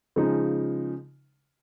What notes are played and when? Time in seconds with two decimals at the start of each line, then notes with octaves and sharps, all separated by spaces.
0.16 C#3 F3 G#3 D#4